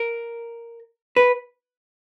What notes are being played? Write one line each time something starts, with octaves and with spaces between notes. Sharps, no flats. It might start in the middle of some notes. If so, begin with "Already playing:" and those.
Already playing: A#4
B4